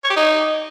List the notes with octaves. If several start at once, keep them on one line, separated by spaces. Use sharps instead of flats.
C#5
G4
D#4